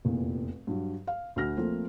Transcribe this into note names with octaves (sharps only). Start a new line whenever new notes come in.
F1 E2 A#2
G2 F#3
F5
D2 F#4 F6 A#6
F3 A3 A#3 C4 F4